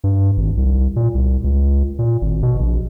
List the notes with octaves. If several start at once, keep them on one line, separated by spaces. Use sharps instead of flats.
G2
G#1
C2
A#2
C2
C#2
A#2
G#1
B2
A#1